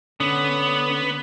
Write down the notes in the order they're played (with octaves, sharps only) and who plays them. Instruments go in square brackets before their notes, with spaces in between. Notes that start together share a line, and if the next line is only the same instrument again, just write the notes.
[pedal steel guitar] D3 C#4 [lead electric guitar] B3